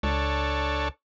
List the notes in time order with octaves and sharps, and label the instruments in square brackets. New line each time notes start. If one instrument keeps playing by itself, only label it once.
[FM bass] C#2 [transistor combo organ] D4 A4 C#5